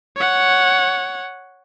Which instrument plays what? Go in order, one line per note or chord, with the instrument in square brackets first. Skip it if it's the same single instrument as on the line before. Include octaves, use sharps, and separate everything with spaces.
[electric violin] C#5 F#5